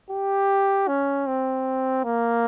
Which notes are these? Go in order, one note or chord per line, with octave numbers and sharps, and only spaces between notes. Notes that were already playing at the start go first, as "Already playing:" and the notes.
G4
C#4
C4
A#3